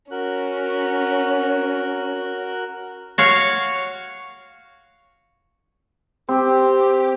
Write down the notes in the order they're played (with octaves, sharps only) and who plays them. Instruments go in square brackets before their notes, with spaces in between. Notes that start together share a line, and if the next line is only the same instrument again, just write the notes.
[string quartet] C#4 [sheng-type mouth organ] F#4 A#4 F#6
[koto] F#4 C#5 F5
[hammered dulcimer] C4 [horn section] G4